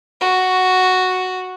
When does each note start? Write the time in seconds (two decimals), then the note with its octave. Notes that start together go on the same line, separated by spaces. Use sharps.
0.21 F#4